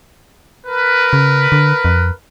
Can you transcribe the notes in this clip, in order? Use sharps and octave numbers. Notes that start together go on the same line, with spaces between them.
A#4 B4
C#3
D3
F2